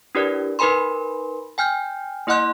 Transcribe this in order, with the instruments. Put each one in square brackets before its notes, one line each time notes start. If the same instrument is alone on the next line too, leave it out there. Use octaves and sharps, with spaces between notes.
[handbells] D4 E4 G4 A#4 B4 D5
D#4 A#4 B4 G#5 B5 C6
G5 G#5 F6 G6
A#3 E4 D#5 F#5 C6 F#6